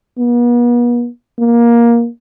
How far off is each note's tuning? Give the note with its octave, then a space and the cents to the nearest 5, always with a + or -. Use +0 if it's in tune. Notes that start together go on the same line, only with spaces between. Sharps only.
B3 -45
A#3 +15